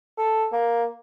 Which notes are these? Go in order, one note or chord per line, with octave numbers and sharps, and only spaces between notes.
A4
A#3